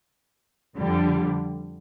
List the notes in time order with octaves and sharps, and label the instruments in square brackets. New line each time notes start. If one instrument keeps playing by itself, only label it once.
[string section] F2 D3 G3